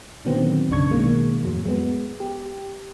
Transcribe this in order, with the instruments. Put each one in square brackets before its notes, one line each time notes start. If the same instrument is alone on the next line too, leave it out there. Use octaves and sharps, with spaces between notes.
[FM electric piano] A#2 D3 D#3 F#3 B3 C4
B1 F#2 C#3 D4 C#6 G#6
B2 D#3 G#3 A#3
F2 A2 F#3
G#3 B3
G4